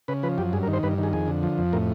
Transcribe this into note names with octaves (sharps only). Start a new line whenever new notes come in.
C#3 B4
F3 B4
F#2 G4
G2 G#4
A#4
D#3
C5
G2 B4
D#3 G#4
F2 G#4
D3
F3
F2
A2 A#4